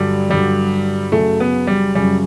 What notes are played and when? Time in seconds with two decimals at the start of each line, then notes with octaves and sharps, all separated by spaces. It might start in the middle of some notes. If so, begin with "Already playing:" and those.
Already playing: G2 D3 F#3 G3
0.30 G2 D3 F#3 G3
1.12 F#2 C#3 F#3 A3
1.40 B3
1.67 G3
1.95 F#2 C#3 F#3 G3